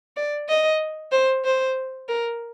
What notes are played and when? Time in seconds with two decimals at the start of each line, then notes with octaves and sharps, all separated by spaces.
0.16 D5
0.49 D#5
1.12 C5
1.45 C5
2.08 A#4